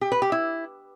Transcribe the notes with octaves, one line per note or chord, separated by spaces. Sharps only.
G4
B4
G4
E4